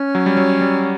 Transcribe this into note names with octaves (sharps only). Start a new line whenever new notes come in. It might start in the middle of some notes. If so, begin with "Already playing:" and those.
Already playing: C#4
F#3
G3
F#3
G3